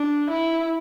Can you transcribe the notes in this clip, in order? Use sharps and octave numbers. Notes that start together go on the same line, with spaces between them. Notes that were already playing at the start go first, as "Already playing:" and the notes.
Already playing: D4
E4